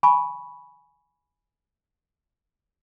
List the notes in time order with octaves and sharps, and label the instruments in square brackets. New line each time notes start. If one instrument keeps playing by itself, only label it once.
[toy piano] G#5 B5 C#6